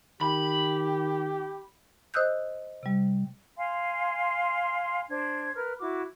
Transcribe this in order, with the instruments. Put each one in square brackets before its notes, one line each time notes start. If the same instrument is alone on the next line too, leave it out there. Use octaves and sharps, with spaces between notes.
[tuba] D#3 [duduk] G4 [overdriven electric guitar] B5
[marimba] C5 D#5 D#6 E6 F#6 G6
C3 G3
[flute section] F5 G#5 C6
D4 C5 G#6
A#4 B4 F6
E4 F#4 D6